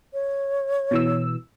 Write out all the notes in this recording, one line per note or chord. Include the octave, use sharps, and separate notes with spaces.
C#5
B2 E3 E6